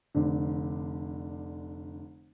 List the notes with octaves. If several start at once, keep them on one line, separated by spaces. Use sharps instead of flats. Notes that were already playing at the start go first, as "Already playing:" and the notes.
F1 D3